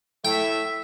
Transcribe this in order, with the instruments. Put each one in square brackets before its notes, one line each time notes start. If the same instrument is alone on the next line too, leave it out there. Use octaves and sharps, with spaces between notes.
[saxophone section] A2 A3 [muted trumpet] E5 [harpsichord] G5